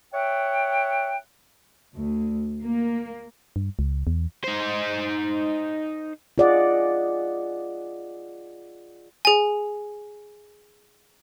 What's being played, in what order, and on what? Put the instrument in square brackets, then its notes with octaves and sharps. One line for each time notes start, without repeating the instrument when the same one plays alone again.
[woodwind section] C#5 E5 F#5 G5
[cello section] D2
A#3
[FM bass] G2
C#2
E2
[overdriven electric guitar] D#4 C5
[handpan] F4 G#4 D5 D#5 F#5
[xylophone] G#4 G#5